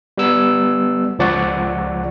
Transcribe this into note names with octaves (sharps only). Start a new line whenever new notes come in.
G3 B3 E6
C#2 F3 D5 F#5 C#6